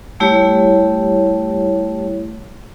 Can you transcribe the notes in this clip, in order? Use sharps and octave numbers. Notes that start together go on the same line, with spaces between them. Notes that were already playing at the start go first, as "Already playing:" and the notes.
G3 A3 E4 G4 C#5